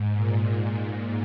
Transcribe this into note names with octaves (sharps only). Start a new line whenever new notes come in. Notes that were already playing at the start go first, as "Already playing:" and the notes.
Already playing: G#2
A#2